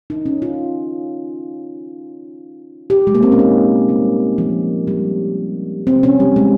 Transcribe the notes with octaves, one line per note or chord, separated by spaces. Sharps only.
D#4
C#4
F4
G4
G#3
A#3
C4
C#4
D#4
G3
F3
G3
C4
C#4
G3
G#3